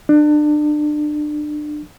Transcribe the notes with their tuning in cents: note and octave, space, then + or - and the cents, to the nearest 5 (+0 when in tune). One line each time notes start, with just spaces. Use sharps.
D4 +30